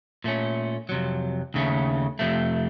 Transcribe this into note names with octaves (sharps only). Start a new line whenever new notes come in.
A#2 A3 C#4
F2 C3 F#3
D#2 C#3 A3 C#4
F2 C3 F3 A3